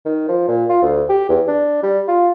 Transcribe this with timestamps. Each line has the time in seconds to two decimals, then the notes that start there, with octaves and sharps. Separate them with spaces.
0.06 D#3
0.29 F3
0.48 A#2
0.70 F4
0.82 D2
1.09 G4
1.29 E2
1.48 D4
1.83 G3
2.08 F4